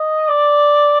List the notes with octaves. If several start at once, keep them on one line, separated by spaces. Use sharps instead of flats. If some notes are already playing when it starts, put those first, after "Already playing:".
Already playing: D#5
D5